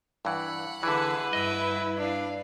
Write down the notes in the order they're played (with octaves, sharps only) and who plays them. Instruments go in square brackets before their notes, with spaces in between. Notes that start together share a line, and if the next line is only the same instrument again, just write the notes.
[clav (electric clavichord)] G2 E3 [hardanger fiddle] F#5 B5
[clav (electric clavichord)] D3 E3 [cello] G#4 E5 [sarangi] B4
[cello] G2 E4 [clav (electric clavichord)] D#5 [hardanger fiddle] E5
[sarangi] D4 [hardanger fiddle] F5